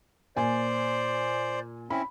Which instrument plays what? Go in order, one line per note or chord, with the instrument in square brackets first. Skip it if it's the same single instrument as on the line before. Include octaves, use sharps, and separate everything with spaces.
[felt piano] A#2 G#5 [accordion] C5 D5
[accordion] C4 C#4 E4 [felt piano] B5